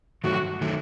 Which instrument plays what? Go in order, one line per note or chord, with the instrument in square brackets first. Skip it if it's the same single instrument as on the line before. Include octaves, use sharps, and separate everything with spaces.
[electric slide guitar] G2 D#3 F#3 A3 [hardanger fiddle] F#4
[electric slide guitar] D#3 F#3 A3